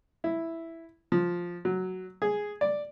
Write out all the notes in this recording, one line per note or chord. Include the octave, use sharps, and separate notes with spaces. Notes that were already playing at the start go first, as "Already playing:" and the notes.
E4
F3
F#3
G#4
D5